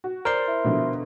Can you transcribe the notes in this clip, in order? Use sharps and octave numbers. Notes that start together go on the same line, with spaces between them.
F#4
A#4 C5 D5 C6
E4
B2 D3 F3